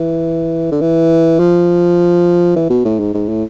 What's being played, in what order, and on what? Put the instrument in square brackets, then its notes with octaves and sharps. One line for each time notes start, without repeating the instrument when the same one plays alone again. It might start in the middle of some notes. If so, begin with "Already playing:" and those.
Already playing: [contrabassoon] E3
D3
E3
F3
E3
B2
A2
G#2
G#2
A2